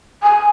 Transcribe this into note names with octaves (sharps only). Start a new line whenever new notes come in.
G#5